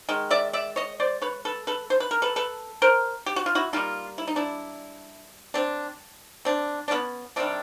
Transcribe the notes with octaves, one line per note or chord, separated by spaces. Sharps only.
D#3 G#3
D5 E5
D5 E5
C#5 D#5
C5 D5
B4 C#5
A4 B4
A4 B4
C5
B4
A#4
A4 B4
A4 B4
A#4 C5
G4
F#4
F4
E4 F#4
D3 G3 A#3 D#4 F4
E4
D#4
D4 E4
C4 D4
C4 D4
D4
B3 C#4
C3 D#3 G3 C4 D4